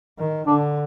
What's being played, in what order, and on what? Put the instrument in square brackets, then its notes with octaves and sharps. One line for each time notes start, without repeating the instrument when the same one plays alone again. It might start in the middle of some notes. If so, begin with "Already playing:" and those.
[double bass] D#3
[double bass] D3 [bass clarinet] D4